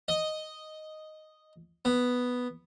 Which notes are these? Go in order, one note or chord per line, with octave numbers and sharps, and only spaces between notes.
D#5
B3